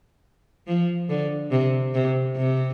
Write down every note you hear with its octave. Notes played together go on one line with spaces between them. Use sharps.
F3
D3
C3
C3
C3